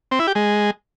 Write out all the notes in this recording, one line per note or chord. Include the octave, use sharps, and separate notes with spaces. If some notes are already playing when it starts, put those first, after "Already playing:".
C4
E4
G4
G#3